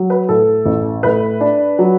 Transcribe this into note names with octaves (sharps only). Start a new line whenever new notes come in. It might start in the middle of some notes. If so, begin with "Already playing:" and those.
Already playing: F#3
B4
A2 A4
A1
A2 B4
D4
F#3